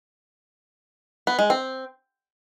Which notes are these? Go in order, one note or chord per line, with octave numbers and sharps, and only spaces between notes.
B3
G#3
C4